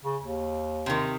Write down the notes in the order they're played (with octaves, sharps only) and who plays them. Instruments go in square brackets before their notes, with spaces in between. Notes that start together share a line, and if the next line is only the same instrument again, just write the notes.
[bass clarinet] C#3
D#2
[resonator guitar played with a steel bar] C3 D#3